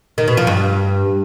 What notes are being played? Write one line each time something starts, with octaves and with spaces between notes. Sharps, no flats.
D#3
B2
F3
G2